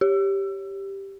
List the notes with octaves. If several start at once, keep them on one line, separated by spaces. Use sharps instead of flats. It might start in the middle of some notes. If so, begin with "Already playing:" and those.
G4